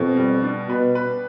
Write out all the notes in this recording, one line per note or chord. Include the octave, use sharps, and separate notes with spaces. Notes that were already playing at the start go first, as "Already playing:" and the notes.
Already playing: F2 B2 G4
G3
D4
B2 B4
B4